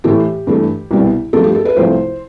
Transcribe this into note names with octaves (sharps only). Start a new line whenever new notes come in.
A2 E3 A3 G4
G2 E3 A3
C2 B2 G3
G2 F3 A3 A4
G4
A4
B4
C2 C3 F3 A3 C5